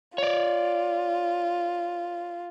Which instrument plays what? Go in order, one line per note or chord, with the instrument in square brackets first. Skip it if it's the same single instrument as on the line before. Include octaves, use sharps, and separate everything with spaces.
[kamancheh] F4 [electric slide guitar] C#5 D5